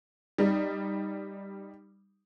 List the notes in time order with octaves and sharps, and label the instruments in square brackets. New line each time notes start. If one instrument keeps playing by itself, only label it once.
[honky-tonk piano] G3 D#4